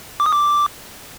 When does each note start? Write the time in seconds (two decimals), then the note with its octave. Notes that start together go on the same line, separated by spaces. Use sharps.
0.20 D6
0.26 D#6
0.33 D6